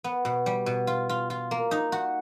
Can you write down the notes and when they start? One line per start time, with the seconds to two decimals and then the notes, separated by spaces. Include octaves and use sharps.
0.04 B3
0.25 B2
0.46 G3
0.66 B2
0.87 F4
1.09 F4
1.30 F4
1.51 A#3
1.71 D#4
1.92 F#4